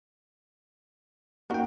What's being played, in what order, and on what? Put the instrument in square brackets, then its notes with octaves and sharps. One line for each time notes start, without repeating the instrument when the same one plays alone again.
[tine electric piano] A#3 D#4 G5 [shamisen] C#4 F#4 A#4